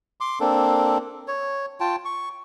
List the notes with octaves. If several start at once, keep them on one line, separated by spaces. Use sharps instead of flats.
C6 D6
A#3 C4 D4 A4
C#5
F4 G5 A5
C#6